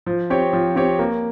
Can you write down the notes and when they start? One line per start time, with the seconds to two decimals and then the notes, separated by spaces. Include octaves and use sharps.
0.06 F3
0.30 C4 G4 C#5
0.53 F3
0.76 C4 G4 C#5
0.99 A#3